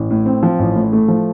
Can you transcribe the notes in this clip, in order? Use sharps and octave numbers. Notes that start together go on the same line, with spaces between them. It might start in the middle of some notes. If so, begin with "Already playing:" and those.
Already playing: A1
A2
C4
F3
A1
A2
A3
F3